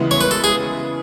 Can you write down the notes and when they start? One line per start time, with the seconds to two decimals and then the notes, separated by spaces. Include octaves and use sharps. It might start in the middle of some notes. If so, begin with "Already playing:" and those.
Already playing: C#3 E3 G#3 B3 E4
0.11 C#5
0.21 B4
0.31 A4
0.44 G#4